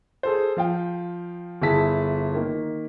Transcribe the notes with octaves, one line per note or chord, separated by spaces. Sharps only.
G#4 A4 C5
F3 F5 G5
G1 E4 G#4 A5 B6
D#3 A#3